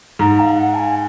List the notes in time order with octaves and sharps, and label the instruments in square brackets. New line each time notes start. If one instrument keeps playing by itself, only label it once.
[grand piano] G#2 [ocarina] A#5
[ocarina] F5
F#5
A5
G#5